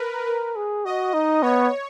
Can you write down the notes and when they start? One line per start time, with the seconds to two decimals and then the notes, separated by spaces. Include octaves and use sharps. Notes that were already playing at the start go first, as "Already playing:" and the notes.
Already playing: A#4 B4
0.27 A#4
0.56 G#4
0.85 F#4 D#5
1.14 D#4
1.43 B3 C#5